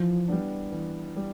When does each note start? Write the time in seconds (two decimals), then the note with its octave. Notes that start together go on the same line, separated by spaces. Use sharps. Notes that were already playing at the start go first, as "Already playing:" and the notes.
Already playing: E3 F3
0.28 G3 B3 D4
0.72 E3
1.16 G3